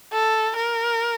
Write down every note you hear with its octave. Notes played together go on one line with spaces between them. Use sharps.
A4
A#4